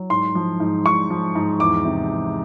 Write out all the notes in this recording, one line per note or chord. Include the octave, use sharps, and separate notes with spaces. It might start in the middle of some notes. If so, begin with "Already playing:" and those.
Already playing: F#3
G#2 C6
F3
G#2
G#2 C#6
F3
G#2
E2 D6
C3
E2